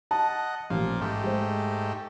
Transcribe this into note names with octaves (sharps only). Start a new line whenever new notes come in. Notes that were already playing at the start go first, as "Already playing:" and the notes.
D#5 F#5 A5
A1 A#2 F3
G#2 A3 G4
G#3 C5